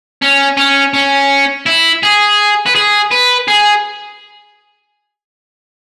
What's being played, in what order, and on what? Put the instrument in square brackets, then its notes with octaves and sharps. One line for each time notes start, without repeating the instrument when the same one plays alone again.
[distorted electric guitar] C#4
C#4
C#4
E4
G#4
B4
G#4
B4
G#4